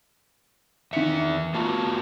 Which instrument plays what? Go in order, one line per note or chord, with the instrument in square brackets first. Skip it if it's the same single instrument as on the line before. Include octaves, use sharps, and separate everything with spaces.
[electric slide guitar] E2 E5 [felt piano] D#3 B6 C#7
[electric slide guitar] A#3 F4 F#4 [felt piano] A5